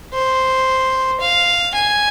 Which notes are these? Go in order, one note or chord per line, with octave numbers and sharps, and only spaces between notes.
C5
F5
G#5